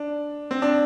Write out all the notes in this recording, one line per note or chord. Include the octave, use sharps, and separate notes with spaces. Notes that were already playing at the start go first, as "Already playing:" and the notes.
Already playing: D4
C4
D4